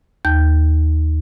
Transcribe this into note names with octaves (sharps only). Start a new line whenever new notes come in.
D#2 G6